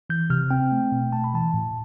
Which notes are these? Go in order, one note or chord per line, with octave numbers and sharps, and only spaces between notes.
E3 G6
C3 F6
C4 G5
A3
B2
A3 A5
B5
E3 A5
A2